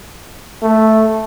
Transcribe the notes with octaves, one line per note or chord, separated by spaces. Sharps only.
A3